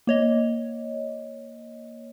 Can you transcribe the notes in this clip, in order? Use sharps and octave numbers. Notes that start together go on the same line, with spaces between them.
A#3 C#5 D#5